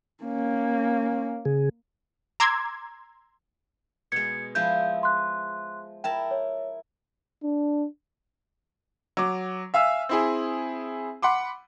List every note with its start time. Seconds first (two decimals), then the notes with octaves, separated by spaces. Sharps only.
0.24 A#3 C#4
1.45 C#3 G#4
2.40 A#5 C6 D6 E6 G#6
4.12 B2 G#3 G#6 C#7
4.55 F3 G#3 E4 G6
5.03 C6 F#6
6.04 E4 A#4 G5 A5
6.31 C#5
7.43 D4
9.17 F#3 D6
9.74 E5 F5 G#5 E6
10.09 C4 E4 G#4
11.22 F#5 B5 C6 D6